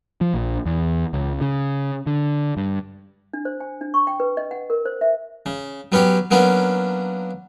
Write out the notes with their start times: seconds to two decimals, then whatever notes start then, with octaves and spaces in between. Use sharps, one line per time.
0.21 F3
0.34 A#1
0.66 E2
1.13 C#2
1.41 C#3
2.07 D3
2.57 G2
3.33 D4
3.45 C5
3.60 G#5
3.81 D4
3.94 C#6
4.07 G5
4.20 B4
4.37 D#5
4.51 F#5
4.70 A#4
4.85 C5
5.01 E5
5.46 C#3
5.92 F#3 B3 C#4 G4 C#5
6.31 F#3 A#3 B3 C#4 D4